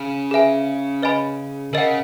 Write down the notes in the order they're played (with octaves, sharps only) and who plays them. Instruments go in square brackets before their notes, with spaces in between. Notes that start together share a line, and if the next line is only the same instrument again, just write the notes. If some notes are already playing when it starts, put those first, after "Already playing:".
Already playing: [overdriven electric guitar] C#3
[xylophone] G#4 B4 E5 G#5
B4 D#5 G#5 B5
[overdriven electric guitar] C#3 [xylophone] A#4 D#5 F#5